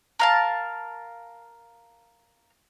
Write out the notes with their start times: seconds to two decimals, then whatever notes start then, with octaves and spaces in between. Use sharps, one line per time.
0.20 A#4 F5 A5